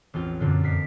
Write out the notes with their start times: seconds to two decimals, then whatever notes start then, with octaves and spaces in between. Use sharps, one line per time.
0.14 A1 E2 C4 F4
0.40 F#2 A#2 D3
0.63 F2 A#4 B6 C7